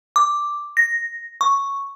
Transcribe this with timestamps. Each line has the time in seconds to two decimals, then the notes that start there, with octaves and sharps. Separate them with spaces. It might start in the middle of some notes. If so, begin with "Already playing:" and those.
0.16 D6
0.77 A#6
1.41 C#6